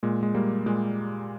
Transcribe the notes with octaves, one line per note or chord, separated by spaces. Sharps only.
A#2 G#3
G#3
G3 A#3
A#2 G#3